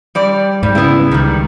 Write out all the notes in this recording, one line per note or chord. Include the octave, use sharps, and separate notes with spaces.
G3 D5
G#2 G3
C#3 B3 E4
C#2 D#3 G3